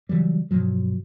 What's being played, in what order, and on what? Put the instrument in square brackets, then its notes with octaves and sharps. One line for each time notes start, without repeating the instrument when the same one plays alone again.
[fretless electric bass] C#3 E3 F#3 G3
G2 B2 F3 F#3